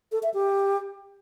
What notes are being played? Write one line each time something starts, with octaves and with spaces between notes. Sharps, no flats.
A4
E5
G4